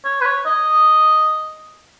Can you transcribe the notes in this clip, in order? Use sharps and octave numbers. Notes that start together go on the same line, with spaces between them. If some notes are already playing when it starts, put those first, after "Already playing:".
C#5
B4
C#5
D#5